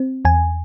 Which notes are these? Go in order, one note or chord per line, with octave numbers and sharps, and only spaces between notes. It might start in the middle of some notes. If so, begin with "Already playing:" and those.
Already playing: C4
E2 G#5